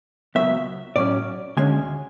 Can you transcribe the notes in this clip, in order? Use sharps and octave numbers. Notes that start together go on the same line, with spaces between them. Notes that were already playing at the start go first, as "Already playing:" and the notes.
C#2 C#3 F#3 B3 E5
A2 F#3 C#4 D5
D2 D3 G#3 C#4 G#5